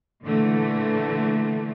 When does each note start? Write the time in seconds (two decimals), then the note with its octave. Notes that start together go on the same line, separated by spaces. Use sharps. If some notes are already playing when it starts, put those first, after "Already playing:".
0.23 A#2 D3 E3 A3